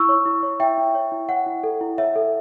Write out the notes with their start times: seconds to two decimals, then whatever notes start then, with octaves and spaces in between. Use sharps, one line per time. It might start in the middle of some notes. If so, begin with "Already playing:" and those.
Already playing: E4 C#6 E6
0.09 C#5
0.26 E4
0.43 C#5
0.60 E4 E5 G5
0.77 E4
0.95 C#5
1.12 E4
1.29 C#5 F#5
1.46 E4
1.63 A4
1.81 E4
1.98 C#5 E5
2.16 A4